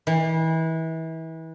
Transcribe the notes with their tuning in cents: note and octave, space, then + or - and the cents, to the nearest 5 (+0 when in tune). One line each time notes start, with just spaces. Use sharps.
E3 -30